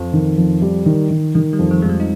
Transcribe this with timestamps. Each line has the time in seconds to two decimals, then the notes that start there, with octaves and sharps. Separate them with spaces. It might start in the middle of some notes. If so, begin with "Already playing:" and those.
Already playing: F2 F3
0.13 D#3
0.37 F2
0.62 G3
0.86 D#3
1.10 D#3
1.35 D#3 G3
1.53 G3
1.59 F2
1.71 F3
1.82 F2 G#3
1.89 G3
2.00 D#4